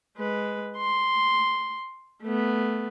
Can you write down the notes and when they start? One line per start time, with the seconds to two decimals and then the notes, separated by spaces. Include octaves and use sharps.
0.17 G#3 B4
0.78 C6
2.23 A3 B3